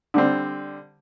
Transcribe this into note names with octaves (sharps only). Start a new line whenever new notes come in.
D3 G3 C4